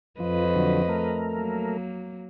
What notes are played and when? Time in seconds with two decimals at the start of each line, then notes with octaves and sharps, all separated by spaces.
0.20 F2 F3 B4 D#5
0.55 D3 F#3
0.89 A3 A#4
1.34 F#3 A#3